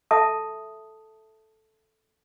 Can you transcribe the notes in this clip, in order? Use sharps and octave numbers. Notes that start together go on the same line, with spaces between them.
A4 E5 A5 D#6